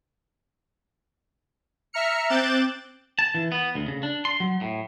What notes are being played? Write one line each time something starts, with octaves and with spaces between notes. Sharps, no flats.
E5 A#5 F6 C#7
C4 D6 F#6 G6 A6 E7
A5
E3
B3
D2
C#3
D4
C6
F#3
A2